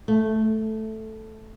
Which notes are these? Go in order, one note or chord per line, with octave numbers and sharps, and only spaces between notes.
A3